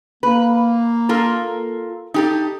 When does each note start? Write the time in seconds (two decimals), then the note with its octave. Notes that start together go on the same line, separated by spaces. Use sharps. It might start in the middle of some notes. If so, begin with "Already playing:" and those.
0.23 A#3 B4
1.09 F4 A4 A#4
2.14 D#4 G4 A4